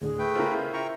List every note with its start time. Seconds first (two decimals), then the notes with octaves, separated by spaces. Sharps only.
0.01 D2 A2 D3 G#4
0.19 A3 B4 G5
0.35 C#3 E4 F4 A#4 C5
0.74 E5 G5 A#5 C#6